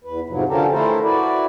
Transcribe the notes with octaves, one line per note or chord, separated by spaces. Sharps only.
E2 B4
F2 G#2 C3 F3 F#3
D3 F3 C#4 G4 A4 A#4
E3 A3 E4 A4 A#4 C5
E4 F#4 B4 D5